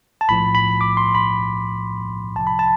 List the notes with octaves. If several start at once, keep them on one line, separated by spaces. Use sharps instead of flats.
A5
B1 A2 F3 B5
B5
D6
C6
B5
C2 C3 F3 A5
B5
A5